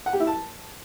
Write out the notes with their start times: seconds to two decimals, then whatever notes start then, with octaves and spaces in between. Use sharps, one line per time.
0.06 F#5
0.13 G4
0.20 E4
0.27 A5